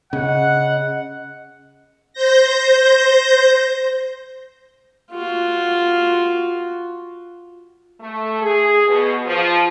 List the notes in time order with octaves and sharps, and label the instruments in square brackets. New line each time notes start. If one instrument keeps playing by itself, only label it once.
[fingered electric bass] C#3 [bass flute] D#5 [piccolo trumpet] F#5
[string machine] C5 G6 A#6
[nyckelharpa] F4 F#4
[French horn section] A3
G#4
B2
F3